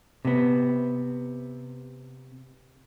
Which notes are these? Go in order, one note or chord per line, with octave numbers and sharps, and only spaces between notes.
C3 B3